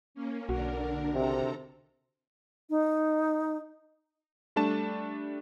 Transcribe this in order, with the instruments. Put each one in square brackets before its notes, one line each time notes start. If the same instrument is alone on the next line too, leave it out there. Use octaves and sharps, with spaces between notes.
[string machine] A#3 C#4
[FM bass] B1 [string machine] D3 D4 A#4 [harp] F#4
[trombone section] C3 [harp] D#3 [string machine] A4 A#5
[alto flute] D#4
[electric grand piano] G3 A3 D4 A5 E7